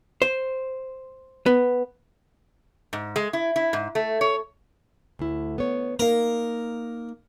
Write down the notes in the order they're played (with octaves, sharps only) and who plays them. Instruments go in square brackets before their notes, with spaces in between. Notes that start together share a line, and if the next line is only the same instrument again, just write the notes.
[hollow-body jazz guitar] C5
B3
[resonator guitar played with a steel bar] G#2
G#3
E4
E4
G#2
A3
C#5
[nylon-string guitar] D2 E4
B3 C#5
[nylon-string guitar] A#3 D#4 F5 [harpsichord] A#4